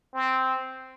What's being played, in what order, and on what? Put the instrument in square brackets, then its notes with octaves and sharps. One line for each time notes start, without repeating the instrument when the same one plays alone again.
[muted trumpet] C4